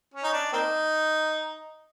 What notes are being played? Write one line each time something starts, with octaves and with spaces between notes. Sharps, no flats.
C#4
D#4
D4
A#3 C4 D#4